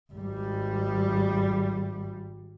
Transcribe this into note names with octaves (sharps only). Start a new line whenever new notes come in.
G#1 G3